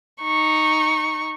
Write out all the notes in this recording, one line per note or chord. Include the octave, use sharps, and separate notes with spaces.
D#4 C#6